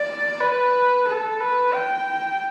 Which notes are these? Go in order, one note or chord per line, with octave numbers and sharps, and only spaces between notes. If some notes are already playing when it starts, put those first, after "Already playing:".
Already playing: D5
B4
A4
B4
G5